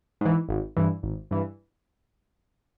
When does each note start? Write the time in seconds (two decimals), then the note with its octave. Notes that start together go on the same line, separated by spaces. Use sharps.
0.21 G#2 E3
0.49 G#1
0.77 G2 E3
1.03 G#1
1.31 G2 E3